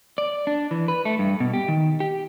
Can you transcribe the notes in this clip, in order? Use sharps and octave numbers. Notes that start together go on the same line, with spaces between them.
D5
D4
E3
B4
A3
G2
B2
G4
D#3
G4